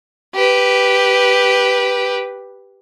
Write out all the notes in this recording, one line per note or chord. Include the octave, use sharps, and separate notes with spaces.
G4 B4